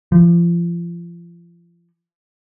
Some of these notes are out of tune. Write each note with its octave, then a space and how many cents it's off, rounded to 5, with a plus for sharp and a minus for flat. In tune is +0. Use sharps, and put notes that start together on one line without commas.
F3 -30